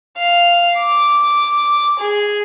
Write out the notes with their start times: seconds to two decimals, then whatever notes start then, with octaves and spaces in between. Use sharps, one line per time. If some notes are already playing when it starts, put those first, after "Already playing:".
0.18 F5
0.79 D6
2.00 G#4